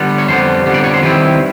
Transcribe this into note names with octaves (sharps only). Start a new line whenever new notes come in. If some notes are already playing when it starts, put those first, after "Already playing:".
Already playing: D3 G3 B3
C#5
F2 D3 G3 B3 C5
F2 D3 G3 B3
D5
C#5
C5
D#3 G3 C4 E4 B4